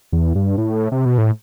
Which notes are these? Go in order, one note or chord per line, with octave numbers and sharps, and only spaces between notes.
E2
G2
A2
C3
B2
A2